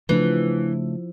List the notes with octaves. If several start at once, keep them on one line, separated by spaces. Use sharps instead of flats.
C#3 E3 F3 A3 D4